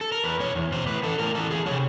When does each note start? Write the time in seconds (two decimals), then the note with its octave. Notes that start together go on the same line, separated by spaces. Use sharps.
0.01 A4
0.12 A#4
0.24 E2 B4
0.40 B2 C#5
0.55 E2
0.72 B2 C5
0.87 A2 B4
1.03 E3 A4
1.19 A2 A#4
1.35 E3 A4
1.50 E2 G#4
1.66 C3 F3 C#5